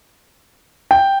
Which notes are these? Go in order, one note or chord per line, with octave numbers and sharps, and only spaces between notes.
G5